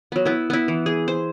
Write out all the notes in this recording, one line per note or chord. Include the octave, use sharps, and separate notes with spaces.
F#3 B3
B3 E4
B3 E4
E3
G#4
C5